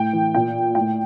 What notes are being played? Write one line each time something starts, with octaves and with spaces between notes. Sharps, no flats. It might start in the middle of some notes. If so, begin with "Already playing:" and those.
Already playing: A2 G5
E3
A#2 G5
A2 G5